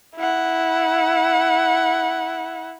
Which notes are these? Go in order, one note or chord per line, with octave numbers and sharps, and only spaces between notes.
E4 F#5